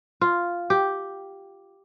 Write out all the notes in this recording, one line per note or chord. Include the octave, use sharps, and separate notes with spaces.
F4
G4